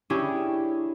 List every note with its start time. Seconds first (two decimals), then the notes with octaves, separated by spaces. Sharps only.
0.10 C#4 D4 E4 G4 G#4